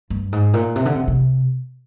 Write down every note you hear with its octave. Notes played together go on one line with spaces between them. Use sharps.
G2
G#2
A#2
C3
D3
C3
C3